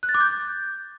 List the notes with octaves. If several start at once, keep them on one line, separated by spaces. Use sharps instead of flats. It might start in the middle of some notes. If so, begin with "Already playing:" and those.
F#6
A6
D6
G6